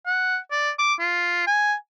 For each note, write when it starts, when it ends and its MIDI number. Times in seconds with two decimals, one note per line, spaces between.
0.06 0.38 78
0.51 0.71 74
0.79 0.94 86
0.99 1.46 65
1.47 1.75 80